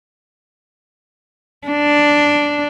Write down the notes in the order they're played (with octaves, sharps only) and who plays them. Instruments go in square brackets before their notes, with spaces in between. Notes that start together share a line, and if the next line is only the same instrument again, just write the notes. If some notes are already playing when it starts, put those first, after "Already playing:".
[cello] D4